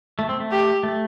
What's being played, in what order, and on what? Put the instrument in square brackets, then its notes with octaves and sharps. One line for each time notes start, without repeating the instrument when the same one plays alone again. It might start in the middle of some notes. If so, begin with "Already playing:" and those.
[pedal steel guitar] A3
C4
A3
[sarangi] G4
[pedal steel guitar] A3